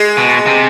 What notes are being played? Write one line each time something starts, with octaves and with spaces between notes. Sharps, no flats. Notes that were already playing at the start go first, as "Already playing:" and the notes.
Already playing: G#3
B2
C3